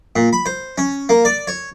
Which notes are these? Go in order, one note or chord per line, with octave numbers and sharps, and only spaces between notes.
A#2
B5
C5
C#4
A#3
D5
C#5